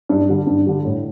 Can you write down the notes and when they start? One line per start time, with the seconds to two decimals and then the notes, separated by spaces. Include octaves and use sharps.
0.09 G2
0.29 D3 G3
0.47 G2
0.66 D3 G3
0.85 A2